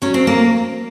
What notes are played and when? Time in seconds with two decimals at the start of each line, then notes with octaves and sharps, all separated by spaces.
0.02 F#3 C#4
0.14 C4
0.27 A#3